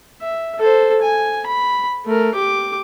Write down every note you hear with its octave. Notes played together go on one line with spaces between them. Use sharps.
E5
A4 C5
G#5
B5
A3 A#4
G4 D6